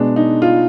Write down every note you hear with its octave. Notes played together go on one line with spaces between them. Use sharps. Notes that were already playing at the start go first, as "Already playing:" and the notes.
Already playing: B2 G#3 B3 D4
D#4
F4